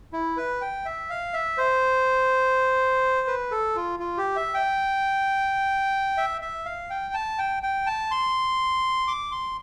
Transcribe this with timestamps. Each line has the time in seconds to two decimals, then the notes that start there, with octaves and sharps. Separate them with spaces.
0.13 E4
0.37 B4
0.61 G5
0.85 E5
1.10 F5
1.33 E5
1.58 C5
3.27 B4
3.51 A4
3.76 F4
4.00 F4
4.18 G4
4.36 E5
4.54 G5
6.17 E5
6.41 E5
6.66 F5
6.90 G5
7.14 A5
7.38 G5
7.63 G5
7.87 A5
8.11 C6
9.07 D6
9.32 C6